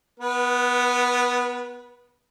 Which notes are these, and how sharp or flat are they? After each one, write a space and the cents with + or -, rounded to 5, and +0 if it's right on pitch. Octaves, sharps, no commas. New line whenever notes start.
B3 +0 B4 -30